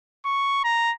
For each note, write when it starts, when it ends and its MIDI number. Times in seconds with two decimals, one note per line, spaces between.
0.25 0.60 85
0.65 0.92 82